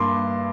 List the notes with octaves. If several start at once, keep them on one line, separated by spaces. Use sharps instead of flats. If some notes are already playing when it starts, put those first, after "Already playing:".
Already playing: G2 A#3 C6 D6